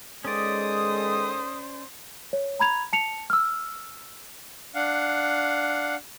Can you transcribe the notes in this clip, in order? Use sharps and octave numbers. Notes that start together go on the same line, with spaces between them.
D#3 G#3 C#4 A4 C5 D5 D#6
C#5
A#5 B5 G#6 F7
A5 C#7 F7
E6 F6
D4 F5 F#5